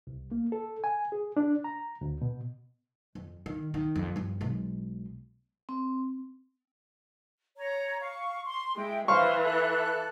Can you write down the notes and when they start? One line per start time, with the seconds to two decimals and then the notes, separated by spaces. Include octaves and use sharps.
0.07 C2
0.32 A#3
0.52 A4
0.84 G#5
1.12 G#4
1.37 D4
1.64 A#5
2.01 D2
2.22 B2
3.15 F2
3.46 D#3
3.74 D#3
3.96 F2
4.16 G2 F3
4.41 B1 G#3
5.69 C4
7.57 C#5 A#5
8.01 F5 C#6
8.45 C6
8.76 G#3 E4 G5
9.08 E3 C5 F5 C6 C#6
9.43 A4 F#6